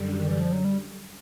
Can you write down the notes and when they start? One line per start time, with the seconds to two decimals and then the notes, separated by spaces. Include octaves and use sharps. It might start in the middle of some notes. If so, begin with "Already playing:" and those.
Already playing: F#2 D3 G3
0.15 D#3
0.28 E3
0.40 F3
0.52 F#3
0.65 G3